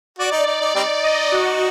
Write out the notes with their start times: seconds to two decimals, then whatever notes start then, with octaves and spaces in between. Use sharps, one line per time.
0.19 F#4 D5
0.32 D#4
0.47 D#4
0.61 D#4
0.75 G3 C4 D#4 D5
1.03 D#5
1.32 F#4